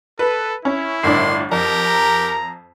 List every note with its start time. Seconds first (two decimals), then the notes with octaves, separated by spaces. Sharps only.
0.19 A4 B4
0.65 C#4 E4
1.03 G1 A2 D#3 D4 C6
1.52 F2 G4 A#4 A#5